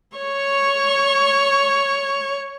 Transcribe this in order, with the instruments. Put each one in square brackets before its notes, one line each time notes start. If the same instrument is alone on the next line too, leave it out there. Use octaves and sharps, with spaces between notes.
[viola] C#5 C#6